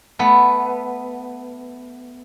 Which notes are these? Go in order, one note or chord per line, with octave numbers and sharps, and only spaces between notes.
A3 B3